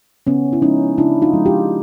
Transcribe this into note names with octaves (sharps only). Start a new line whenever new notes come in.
C#3 B3 C#4
E4
F3 G#3 C#4 D#4
C#3 D4 E4
D#4 F4
F3 G#3
F4 G4